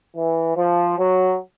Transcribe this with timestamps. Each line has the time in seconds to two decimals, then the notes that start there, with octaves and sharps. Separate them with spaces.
0.15 E3
0.56 F3
0.97 F#3